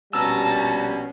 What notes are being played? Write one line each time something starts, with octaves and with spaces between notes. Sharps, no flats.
A#1 B2 G3 C#4 A5 A#5 E6